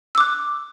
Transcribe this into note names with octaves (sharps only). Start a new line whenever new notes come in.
D6 E6 F#6